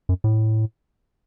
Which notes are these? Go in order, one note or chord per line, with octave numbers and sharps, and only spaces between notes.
F#2
A2